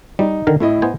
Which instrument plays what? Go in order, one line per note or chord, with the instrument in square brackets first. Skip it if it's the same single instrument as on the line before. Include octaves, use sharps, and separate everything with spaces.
[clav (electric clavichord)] G3 [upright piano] D#4
[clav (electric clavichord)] D3 D#3 A#4
[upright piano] A2 E4 D#5 [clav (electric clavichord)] A3
[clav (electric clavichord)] B3 C5 G#5